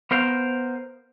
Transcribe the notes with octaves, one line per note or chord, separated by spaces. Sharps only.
B3 A#4 C5 F5